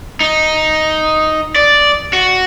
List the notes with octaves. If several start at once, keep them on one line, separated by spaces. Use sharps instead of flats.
D#4
D5
F#4